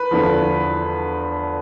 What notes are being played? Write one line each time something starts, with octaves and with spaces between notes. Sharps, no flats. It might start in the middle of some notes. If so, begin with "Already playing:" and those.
Already playing: B4
E2 D3 F3